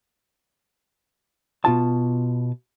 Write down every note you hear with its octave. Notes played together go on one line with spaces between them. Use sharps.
B2 F4 A5